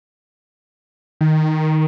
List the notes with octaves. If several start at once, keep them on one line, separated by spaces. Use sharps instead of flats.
D#3